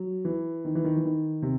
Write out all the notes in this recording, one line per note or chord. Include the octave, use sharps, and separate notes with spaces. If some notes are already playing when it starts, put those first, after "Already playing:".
Already playing: F#3
E3
D#3
E3
D#3
E3
D#3
C3